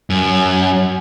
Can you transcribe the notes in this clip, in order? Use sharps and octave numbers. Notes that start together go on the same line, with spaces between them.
F#2